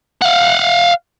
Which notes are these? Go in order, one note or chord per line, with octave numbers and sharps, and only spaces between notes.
F5 F#5